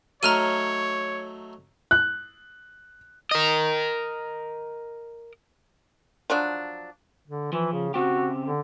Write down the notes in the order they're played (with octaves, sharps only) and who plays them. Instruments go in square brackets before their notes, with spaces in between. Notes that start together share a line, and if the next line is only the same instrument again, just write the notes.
[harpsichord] F#3 A3 D#4 [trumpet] C#5 [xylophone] A#5 F6 D#7
[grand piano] F#6
[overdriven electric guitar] A#4 D#5
[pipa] F3 F#3 D4
[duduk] D3
[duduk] E3 [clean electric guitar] F3
[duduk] C#3
[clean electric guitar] C#3 C4 G4 [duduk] F#4
[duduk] D3